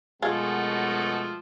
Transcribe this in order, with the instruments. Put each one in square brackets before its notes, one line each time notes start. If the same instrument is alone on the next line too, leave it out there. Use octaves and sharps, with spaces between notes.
[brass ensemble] F#2 B2 G#3 [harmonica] F3 A3 F#4 [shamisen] F4 G#4